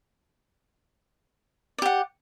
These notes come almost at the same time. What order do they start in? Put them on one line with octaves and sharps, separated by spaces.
D5 G4 F#5